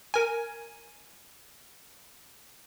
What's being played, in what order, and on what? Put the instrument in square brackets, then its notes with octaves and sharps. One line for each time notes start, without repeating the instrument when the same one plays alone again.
[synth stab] A#4 G#5